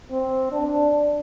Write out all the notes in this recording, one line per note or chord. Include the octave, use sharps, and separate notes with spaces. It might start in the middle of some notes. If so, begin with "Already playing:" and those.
C4
D4